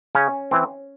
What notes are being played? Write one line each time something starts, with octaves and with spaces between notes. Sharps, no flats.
C#3 C#4
E3 C4